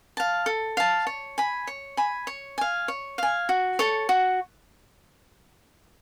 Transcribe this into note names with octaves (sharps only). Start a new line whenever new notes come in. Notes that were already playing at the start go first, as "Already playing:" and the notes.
F5 A5
A4
F5 A5
C#5
G#5 B5
C#5
G#5 B5
C#5
F5 G#5
C#5
F5 G#5
F#4
A4 C#5
F#4